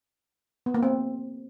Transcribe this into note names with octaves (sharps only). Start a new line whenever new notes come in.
B3
A#3
C4